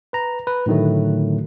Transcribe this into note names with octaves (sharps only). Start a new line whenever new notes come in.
B4 A#5
B4
A2 D3 D#3 F#3 A3